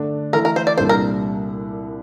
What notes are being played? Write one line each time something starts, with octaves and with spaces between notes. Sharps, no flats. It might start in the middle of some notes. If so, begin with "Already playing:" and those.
Already playing: D3 A3 D4
E3 A3 E4 A4 A#4
A#4
C5
D5
C2 A#2 G3 D4 A4 C5
A#4